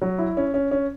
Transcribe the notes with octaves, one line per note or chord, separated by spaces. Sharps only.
F#3
E4
C#4
C#4
C#4